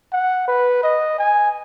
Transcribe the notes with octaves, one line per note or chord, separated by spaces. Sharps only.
F#5
B4
D#5
G#5